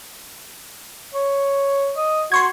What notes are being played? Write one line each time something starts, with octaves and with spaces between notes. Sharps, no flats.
C#5
D#5
F#4 C6 C#6 G#6